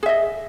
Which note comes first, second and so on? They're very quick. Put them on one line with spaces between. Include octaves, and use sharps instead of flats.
G#4 E5 D#5